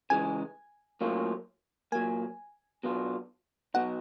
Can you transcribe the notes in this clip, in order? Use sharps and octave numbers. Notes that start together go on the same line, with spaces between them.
C#3 E3 G#3 G#5
A2 F#3 A#3 C#4 F4
A#2 F#3 A#3 G#5
B2 F#3 B3 D4 F4
B2 F#3 B3 D#4 F#5